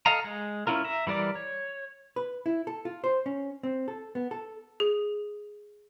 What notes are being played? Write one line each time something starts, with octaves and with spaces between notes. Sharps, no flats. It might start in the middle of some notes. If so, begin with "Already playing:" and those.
A4 D#5 F5 A#5
G#3
C#4 E4 F4 A#4
E5 A#5
E3 G3 A#4 D5 D6
C#5
B4
E4
A4
F4
C5
C#4
C4
A4
B3
A4
G#4